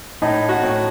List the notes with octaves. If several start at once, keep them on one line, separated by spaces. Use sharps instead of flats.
A2 D#4
F#4
A2